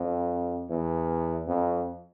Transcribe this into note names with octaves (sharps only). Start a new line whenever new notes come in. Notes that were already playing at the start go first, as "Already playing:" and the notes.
Already playing: F2
E2
F2